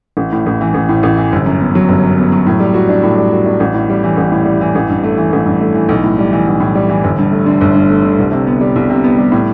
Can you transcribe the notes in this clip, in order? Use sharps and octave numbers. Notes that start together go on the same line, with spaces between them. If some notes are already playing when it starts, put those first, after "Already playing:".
A1
A2
A1
E3
A1
A2
A1
E3
G1
F#2
B3
F#3
G1
F#2
B3
F#3
A2
G3
F#4
D4
A2
G3
F#4
D4
A1
A2
G3
E3
A1
A2
G3
E3
A1
G2
A3
E3
A1
G2
A3
E3
B1
A2
G3
E3
B1
A2
G3
E3
G1
G2
A3
D3
G1
G2
A3
D3
C2
C3
B3
G3
C2
C3
B3
G3
A2